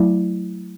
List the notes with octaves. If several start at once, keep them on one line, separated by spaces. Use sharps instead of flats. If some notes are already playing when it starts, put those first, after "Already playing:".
Already playing: F#3 A3 E4